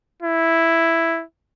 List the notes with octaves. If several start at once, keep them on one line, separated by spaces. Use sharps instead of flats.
E4